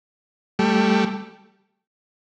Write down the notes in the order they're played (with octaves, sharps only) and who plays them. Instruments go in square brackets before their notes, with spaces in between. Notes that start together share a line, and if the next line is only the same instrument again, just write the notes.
[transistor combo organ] G3 A3